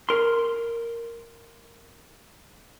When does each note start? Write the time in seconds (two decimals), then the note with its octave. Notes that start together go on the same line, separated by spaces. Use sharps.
0.09 A#4 C6